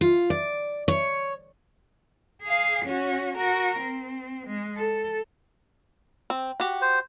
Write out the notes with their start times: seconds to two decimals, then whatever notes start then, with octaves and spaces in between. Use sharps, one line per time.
0.01 F4
0.30 D5
0.88 C#5
2.43 G#4 F5
2.85 C#4 F#4
3.37 F#4 A#4
3.80 C4
4.47 G#3
4.77 A4
6.30 C4
6.60 F#4 G4
6.82 C5